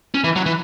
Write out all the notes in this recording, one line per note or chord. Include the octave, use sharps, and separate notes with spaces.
C#4
E3
F#3
E3